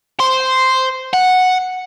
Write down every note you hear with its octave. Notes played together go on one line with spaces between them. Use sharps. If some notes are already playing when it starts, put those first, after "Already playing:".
C5
F#5